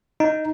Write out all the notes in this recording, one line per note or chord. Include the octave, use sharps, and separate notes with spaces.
D#4